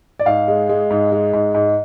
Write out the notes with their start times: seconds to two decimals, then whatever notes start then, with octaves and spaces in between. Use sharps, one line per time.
0.19 D5
0.26 G#2 F5
0.48 G#3
0.69 G#3
0.90 G#2
1.12 G#3
1.33 G#2
1.54 G#2